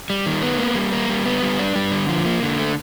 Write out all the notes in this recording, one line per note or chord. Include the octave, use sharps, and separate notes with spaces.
G3
D#3
B3
A#3
G3
A#3
G3
B3
G3
D4
G3
D3
F3
A#3
D3
A3